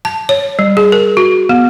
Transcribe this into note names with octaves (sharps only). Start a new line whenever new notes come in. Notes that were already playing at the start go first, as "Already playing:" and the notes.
A5
C#5
G3
G#4
A#4
F#4
B3